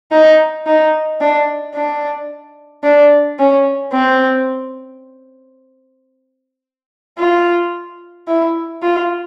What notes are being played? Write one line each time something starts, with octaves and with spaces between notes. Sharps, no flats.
D#4
D#4
D4
D4
D4
C#4
C4
F4
E4
F4